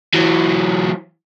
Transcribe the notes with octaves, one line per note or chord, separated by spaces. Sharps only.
E3 F#3